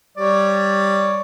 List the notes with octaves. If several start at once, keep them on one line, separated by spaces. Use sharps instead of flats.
G3 C#5 D5